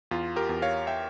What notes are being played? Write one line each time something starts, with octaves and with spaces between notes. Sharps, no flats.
E2 F4
G4 A#4
E2
C#5 F5
E5 G5